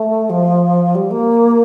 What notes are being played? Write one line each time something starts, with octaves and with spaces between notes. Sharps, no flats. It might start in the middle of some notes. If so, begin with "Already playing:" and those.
Already playing: A3
F3
G3
A#3